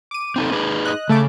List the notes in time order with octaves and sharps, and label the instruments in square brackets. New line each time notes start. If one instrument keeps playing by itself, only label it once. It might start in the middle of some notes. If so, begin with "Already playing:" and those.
[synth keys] D6 D#7
[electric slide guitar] C4 D#4 A4
D#4 G#4 B4
[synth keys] D#5 F#6
[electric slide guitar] C#3 [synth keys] A3 A5 D6